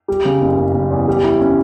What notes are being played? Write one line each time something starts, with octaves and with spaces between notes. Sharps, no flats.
G3
C#3
F#1
F#1
F#1
E2
G3
E4
C#4